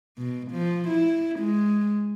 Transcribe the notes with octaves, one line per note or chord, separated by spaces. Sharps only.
B2
F3
E4
G#3